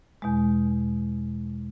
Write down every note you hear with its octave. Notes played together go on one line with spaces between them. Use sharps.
E2 B2 G#3